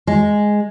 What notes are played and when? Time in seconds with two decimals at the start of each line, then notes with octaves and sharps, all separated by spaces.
0.07 G#3